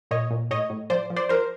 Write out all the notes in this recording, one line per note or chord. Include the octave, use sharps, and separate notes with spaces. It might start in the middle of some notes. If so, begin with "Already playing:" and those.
A#2 C#5 D#5
A#2
A2 C#5 D#5
A2
F3 C5 D5
F3
C5 D5
F3 A#4 C5